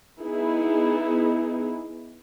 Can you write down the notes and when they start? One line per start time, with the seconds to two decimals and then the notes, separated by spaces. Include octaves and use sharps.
0.19 B3 D#4 E4 G#4